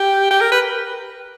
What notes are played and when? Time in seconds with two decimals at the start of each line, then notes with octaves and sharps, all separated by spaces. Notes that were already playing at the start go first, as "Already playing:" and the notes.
Already playing: G4
0.31 G4
0.41 A#4
0.52 B4